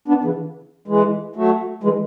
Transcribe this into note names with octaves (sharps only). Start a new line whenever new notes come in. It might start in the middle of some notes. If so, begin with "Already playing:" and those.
B3 D4
C#3 E3
E3 G#3
F#3 A3
E3 G#3